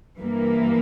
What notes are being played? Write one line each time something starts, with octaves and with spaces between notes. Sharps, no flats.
G2 E3 A#3